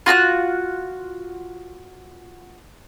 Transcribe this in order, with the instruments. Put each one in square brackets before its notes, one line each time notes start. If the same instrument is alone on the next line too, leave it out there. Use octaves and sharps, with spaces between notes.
[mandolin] F4 F#4 F6 F#6